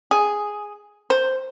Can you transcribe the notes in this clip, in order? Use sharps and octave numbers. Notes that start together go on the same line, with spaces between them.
G#4
C5